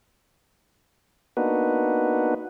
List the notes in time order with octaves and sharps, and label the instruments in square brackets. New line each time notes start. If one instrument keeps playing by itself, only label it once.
[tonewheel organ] A#3 B3 D4 D#4 F#4 B4